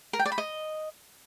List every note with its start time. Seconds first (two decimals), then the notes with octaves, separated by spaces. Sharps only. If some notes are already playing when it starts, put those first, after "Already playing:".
0.13 A#4
0.19 G5
0.26 D5
0.32 B5
0.38 D#5